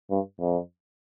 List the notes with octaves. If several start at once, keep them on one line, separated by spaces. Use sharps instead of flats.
G2
F2